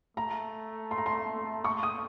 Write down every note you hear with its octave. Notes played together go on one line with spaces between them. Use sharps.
A3 A#5
C6
A#5
C6
A3 C#6
D#6